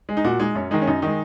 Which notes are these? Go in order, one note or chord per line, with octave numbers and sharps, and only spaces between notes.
G#3
D#4
A#2 F#4
G#3 D#4
F#2 C#4
D#3 G#3 D#4
C#4
F#2 D#4
D#3 G#3 D#4